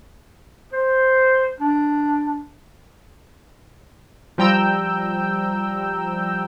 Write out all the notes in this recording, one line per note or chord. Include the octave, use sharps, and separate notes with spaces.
C5
D4
F3 G3 G5 A#5 E6 G6